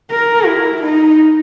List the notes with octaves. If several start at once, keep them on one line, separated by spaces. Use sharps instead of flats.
A#4
E4
D#4